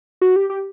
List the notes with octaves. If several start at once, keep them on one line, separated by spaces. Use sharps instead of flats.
F#4
G4
G4